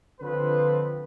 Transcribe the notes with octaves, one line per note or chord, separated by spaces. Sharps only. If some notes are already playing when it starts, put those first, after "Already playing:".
D3 F3 C4 B4